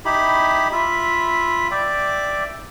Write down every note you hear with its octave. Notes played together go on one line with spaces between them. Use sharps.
D#4 E4 G4 B5
F4 E5 B5
D5 E5 G5 D6